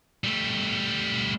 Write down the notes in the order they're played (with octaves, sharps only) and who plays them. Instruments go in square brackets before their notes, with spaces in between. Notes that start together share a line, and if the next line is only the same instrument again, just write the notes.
[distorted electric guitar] G3 A3